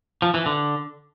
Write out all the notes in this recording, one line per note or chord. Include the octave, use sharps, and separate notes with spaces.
F3
E3
D3